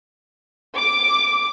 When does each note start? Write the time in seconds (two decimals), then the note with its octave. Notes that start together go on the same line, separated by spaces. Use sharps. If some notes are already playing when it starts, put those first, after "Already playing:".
0.78 D6